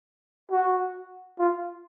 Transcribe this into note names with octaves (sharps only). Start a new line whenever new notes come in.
F#4
F4